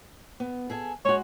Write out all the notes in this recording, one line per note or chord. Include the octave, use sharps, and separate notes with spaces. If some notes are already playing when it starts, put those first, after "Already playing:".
B3
G#4 A4 G#5
G#3 F#4 C#5